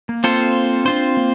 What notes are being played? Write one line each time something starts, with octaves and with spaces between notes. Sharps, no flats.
A#3
C4 F4 A4 C5
C4 D4 F4 C5
A#3